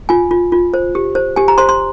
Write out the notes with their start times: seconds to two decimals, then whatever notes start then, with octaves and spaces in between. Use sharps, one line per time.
0.09 F4 G#5
0.31 F4
0.52 F4
0.74 C5
0.95 G4
1.15 C5
1.36 G4 G#5
1.48 A#5
1.58 C5 C6
1.69 C6